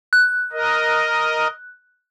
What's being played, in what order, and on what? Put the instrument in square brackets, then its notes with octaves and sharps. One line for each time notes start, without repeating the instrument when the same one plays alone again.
[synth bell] F#6
[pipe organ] A#4 D#5